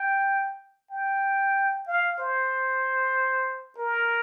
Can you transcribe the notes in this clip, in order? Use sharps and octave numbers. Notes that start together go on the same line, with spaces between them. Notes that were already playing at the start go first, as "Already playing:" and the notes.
Already playing: G5
G5
F5
C5
A#4